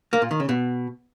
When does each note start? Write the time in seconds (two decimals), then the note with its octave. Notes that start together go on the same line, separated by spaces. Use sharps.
0.13 A#3
0.22 A#2
0.31 D#3
0.40 C#3
0.49 B2